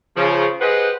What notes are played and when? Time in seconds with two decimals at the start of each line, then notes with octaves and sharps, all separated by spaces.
0.16 C#3 F3
0.61 G4 G#4 B4 C5 D#5 F#5